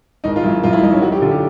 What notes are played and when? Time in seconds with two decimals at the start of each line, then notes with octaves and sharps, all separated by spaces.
0.24 G#1 D#4
0.36 F4
0.44 F#2 E4
0.63 F#2 F4
0.73 E4
0.83 F#2 D#4
0.93 C#4
1.02 F#2 F#4
1.12 G4
1.22 D3 F4
1.31 G4